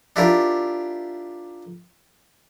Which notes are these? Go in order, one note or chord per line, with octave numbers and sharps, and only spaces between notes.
D4 E4 F4 G4 A#4